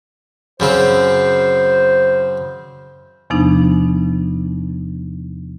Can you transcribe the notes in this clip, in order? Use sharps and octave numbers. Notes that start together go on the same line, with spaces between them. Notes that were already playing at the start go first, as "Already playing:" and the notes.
F#2 C#3 C4 C5
E2 C3 F3 B3 D4 D#4